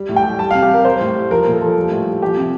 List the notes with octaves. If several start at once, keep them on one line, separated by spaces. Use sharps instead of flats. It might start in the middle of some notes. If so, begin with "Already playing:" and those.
Already playing: G3
A2
G5
G3
G3 A5
F5
C3
G4
G3 A#4
G3 C5
A2
G3
F3 A#4
A#2
A4
F3
G3
A2
G3
F3 G4
C3